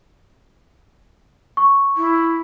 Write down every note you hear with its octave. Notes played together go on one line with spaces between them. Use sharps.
C#6
E4